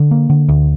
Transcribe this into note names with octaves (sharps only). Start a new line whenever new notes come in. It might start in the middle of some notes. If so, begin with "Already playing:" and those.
Already playing: D3
A#3
D3
D2